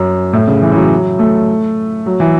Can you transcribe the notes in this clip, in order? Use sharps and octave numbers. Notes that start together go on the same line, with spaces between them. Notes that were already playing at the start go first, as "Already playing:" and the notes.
Already playing: F#2
A2
C#3
E3
E3
F#3
A3
F#3
E3